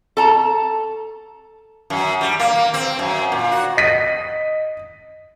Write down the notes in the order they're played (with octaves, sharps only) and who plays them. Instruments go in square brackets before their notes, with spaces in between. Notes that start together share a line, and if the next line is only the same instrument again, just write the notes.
[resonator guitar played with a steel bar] A4 A5 A#5
[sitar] F#2
G3
A#3
A#3
C4
F#2
A#2
F#4
[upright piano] D#5 B6 D#7